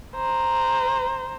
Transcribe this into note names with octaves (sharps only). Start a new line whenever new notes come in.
C5 A#5